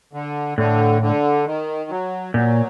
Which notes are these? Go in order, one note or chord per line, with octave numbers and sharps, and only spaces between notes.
D3
A2 D3
D3
D#3
F#3
A#2 F#3